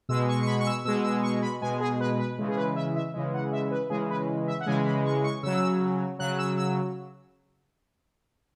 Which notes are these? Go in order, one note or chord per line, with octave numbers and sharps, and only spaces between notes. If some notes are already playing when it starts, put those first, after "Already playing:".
B2 G#3 E6
C#6
C#6
B5
C#6
E6
B2 G#3 E6
E6
C#6
B5
B2 G#3 G#5
G#4
B4
B4
C#3 E3 G#3
G#4
B4
E5
E5
C#3 E3 G#3
F#5
E5
B4
C#3 E3 G#3 G#4
B4
E5
F#5
C#3 E3 G#3 G#5
B5
C#6
C#6
C#3 F#3 E6
C#3 F#3 F#6
E6
E6